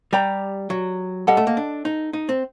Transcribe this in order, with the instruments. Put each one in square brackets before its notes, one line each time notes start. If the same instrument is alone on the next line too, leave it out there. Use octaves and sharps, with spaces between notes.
[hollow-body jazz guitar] G3 [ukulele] G4 D5 G5 A#5
[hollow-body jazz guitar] F#3
[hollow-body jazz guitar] G3 [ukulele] A4 D#5 F#5
[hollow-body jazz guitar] A3
A#3
D4
D#4
D#4
C4